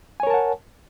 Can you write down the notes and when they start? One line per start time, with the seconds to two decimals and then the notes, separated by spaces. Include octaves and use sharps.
0.20 G#5
0.23 C#5
0.27 A#4
0.30 A5
0.34 F#5